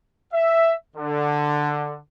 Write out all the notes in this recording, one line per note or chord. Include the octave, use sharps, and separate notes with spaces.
E5
D3